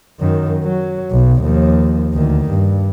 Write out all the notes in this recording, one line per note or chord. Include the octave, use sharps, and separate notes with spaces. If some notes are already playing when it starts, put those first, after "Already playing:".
F#2 D#3
F#3
B1
D#2 F3
D2 D#3
G2